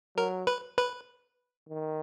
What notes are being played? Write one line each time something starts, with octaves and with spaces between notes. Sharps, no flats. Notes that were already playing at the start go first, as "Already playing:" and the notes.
F#3 A#4
B4
B4
D#3